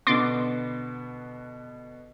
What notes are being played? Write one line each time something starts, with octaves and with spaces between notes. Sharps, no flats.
B2 D3 B3 C6 D6 A6